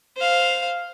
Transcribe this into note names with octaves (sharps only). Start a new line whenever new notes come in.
C5 F5